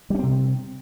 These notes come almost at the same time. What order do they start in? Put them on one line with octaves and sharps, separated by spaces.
G3 C#4 C4 C3